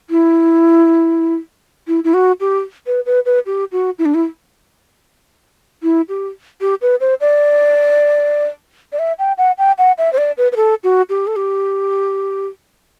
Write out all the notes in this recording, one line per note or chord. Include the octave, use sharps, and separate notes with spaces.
E4
E4
E4
F#4
G4
B4
B4
B4
G4
F#4
E4
D4
E4
E4
G4
G4
B4
C5
D5
D5
E5
G5
F#5
G5
F#5
E5
C5
D5
B4
B4
A4
F#4
G4
A4
G4